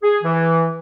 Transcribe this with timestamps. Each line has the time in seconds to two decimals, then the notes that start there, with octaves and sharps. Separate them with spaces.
0.03 G#4
0.23 E3